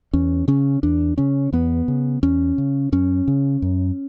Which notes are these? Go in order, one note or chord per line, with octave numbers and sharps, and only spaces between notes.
E2 C#4
C#3 C#4
E2 D4
C#3 C#4
E2 B3
C#3
E2 C#4
C#3
F#2 C#4
C#3
F#2